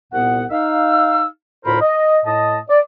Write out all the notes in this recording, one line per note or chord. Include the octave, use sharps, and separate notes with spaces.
C2 A#2 B3 F#5
D#4 F5 E6
D2 A2 F4 A#4 C5 B5
D#5
A2 D#5 A5
D5